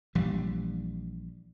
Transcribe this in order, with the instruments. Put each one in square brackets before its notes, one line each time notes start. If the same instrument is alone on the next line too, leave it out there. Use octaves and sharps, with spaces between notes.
[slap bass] A#1 E3 G3